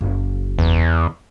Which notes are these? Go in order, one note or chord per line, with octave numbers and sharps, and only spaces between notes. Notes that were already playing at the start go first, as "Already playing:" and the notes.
F#1
E2